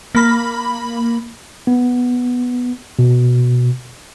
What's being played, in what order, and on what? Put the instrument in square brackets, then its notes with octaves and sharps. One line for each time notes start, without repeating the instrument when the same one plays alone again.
[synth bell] A#3 B5
[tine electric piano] B3
B2